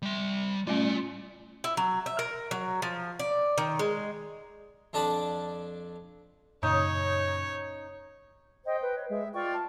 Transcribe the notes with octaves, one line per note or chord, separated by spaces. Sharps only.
G3 C6
G3 A3 C#4 F4 D5
E4
F#3
E5
A#4
F#3
F3
D5
D#3
G#3
F2 D4 D5 A5 B5 D#6
F#2 A#2 C#3 C#4 D#4 C#5
C5 D#5 G5
B4
C#5
G#3 E5
F4 D5 G5 C#6
A5